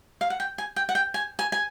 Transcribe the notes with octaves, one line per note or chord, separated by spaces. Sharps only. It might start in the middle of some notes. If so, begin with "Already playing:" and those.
F5
F#5
G5
G#5
G5
F#5
G5
G#5
G#5
G#5